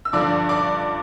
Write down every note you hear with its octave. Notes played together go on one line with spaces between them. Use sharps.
E6
G2 D3 F3 D5 D6
D5 D6